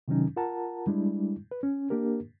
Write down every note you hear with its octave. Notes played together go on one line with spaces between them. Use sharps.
C3 D#3 F#3 C#4 D#4
F4 A#4 F#5 A5 A#5
G3 G#3 D4 E4
B4
C#4
A#3 D4 G4 A#4